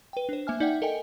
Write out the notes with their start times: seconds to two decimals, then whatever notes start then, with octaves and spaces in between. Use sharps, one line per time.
0.13 B4 G5
0.29 D4 C5
0.47 A#3 E5 G#5 F6
0.60 D#4 D5 E5 F#5 G5
0.82 A4 A#4 D#5 G5 G#5